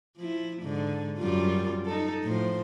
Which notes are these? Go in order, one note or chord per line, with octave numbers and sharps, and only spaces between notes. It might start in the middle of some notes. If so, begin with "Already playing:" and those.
F3 E4
G#2 D3
F#2 G3 F4
D#4 A4
A2 F3 C5